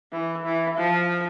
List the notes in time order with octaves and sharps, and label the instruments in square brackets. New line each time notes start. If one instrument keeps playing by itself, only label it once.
[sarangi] E3
E3
F3